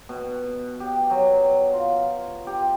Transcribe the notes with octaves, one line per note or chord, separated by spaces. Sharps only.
B2
G4
F#3
F4
G4